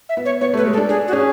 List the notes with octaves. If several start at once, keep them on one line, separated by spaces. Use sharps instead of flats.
E5
B3
C#5
B3 C#5
A3 B4
G#3
A4
D4
D4 G#4
F#4
C#4 G#4